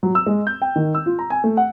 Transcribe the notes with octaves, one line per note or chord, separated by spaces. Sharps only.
F#3
E6
G#3
G6
G5
D#3
E6
F4
A#5
G#5
A3
F#5